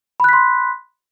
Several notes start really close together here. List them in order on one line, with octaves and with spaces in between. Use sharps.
B5 F#6 B6 C6